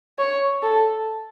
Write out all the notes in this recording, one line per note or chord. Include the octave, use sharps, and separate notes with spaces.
C#5
A4